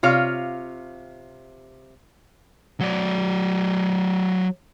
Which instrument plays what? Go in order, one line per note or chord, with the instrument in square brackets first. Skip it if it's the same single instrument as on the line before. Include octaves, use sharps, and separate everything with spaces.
[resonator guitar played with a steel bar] C3 F4 C#5 F5
[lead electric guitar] F#3 D5